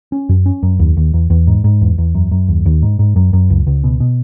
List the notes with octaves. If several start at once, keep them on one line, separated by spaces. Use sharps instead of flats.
C#4
F#2
C#4
F#2
D#2
D#2
E2
E2
G#2
G#2
E2
E2
F#2
F#2
D#2
D#2
G#2
G#2
F#2
F#2
C#2
C#2
B2
B2